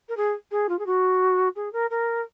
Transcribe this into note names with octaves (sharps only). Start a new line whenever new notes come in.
A#4
G#4
G#4
F4
G#4
F#4
G#4
A#4
A#4